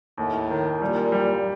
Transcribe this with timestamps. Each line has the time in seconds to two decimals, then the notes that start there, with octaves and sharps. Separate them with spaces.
0.18 D#2 A2
0.50 D#3
0.81 A#2 G3
1.12 G3